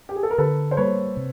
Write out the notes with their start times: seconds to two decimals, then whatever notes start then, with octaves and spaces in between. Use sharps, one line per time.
0.09 G4
0.16 G#4
0.23 A4
0.31 A#4
0.38 D3 A4 B4
0.71 C5
0.77 G3 A#3 B4 C#5
1.17 C3